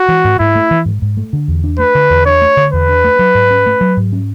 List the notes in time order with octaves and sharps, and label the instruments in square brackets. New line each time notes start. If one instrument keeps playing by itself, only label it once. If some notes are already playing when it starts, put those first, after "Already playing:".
Already playing: [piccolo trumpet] F#4
[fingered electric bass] E3
G#2
[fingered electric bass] G#2 [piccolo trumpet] E4
[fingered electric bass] A3
E3
G#2
G#2
A3
D3
E2
D4
[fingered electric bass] A3 [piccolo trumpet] B4
[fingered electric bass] D3
E2
[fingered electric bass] D4 [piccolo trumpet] C#5
[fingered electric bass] A3
D3
[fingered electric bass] E2 [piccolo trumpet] B4
[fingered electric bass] D4
A3
F#3
G#2
C#4
A3
F#3
G#2
C#4